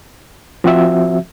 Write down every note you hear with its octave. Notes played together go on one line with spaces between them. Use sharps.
F3 C4 F#4 E5